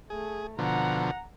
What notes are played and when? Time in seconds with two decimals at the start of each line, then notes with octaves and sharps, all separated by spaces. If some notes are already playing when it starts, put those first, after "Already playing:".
0.10 A3 G#4
0.59 B2 D3 F3 F#5 A#5